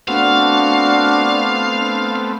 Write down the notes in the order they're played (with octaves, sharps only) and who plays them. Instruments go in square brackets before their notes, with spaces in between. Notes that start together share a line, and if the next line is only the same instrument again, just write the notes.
[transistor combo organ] A3 B3 C4 [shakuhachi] D4 [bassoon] F#4 [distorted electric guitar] F5